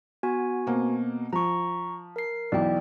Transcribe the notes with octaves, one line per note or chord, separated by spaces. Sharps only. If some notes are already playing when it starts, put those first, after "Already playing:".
B3 F#4 G#5
B2 A#3 C4
F3 A#5 C#6
A#4 C7
B1 E3 D5 G5